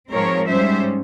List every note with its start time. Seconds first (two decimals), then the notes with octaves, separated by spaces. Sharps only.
0.12 G#2 F3 G#3 C4 A#4 C#5
0.50 G#2 G3 C#4 C5 E5